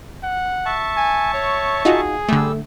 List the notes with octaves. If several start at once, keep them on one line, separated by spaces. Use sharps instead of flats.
F#5
E5 A5 C#6
G#5
C#5
D#4 F4 F#4 G#4
D3 G3 A3 E6